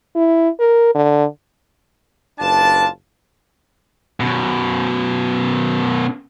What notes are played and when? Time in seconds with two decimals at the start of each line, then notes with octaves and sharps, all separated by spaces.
0.16 E4
0.60 A#4
0.95 D3
2.39 F#1 D4 F4 B4 A5
4.20 F#2 B2